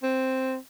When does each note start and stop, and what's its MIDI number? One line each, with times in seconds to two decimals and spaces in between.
0.03 0.56 60